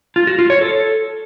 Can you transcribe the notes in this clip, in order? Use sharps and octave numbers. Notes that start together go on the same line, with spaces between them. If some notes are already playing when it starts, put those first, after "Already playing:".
F4
F#4
F4
C#5
A4